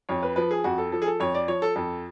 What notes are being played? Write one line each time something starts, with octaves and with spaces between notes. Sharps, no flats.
F2 C#5
B4
F3 B4
G#4
F2 F#4
A4
F3 A4
G#4
A4
F2 C#5
D5
F3 C#5
A4
F2 A4